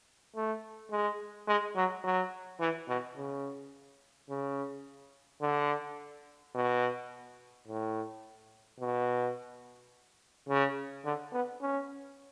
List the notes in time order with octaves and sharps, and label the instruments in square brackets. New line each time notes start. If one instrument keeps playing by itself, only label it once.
[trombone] A3
G#3
G#3
F#3
F#3
E3
B2
C#3
C#3
D3
B2
A2
B2
C#3
D3
B3
C#4